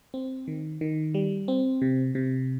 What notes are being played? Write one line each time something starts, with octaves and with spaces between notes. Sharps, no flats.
C4
D#3
D#3
G3
C4
C3
C3